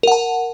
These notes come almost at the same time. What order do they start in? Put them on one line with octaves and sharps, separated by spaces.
A#4 F#5 A5